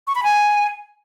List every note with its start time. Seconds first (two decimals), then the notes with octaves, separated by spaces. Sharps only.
0.07 C#6
0.15 B5
0.23 G#5